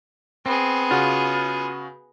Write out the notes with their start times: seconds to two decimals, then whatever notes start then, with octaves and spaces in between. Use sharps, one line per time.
0.46 B3 C4 G#4
0.91 C#3 F4 F#4 F#5